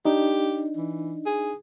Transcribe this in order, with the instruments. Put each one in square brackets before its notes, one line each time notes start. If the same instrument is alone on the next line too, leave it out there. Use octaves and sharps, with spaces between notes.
[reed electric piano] D4 D#4 [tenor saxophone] G4
[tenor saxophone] E3
G#4